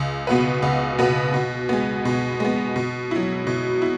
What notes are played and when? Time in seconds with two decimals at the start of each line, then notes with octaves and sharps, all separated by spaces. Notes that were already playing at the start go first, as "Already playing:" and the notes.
Already playing: C#2
0.27 B2 B3 F#4 B4
0.62 C#2
0.99 B2 B3 F#4 B4
1.34 B2
1.69 G#3 B3
2.05 B2
2.40 G#3 B3
2.76 B2
3.11 F#3 E4
3.47 B2
3.82 E4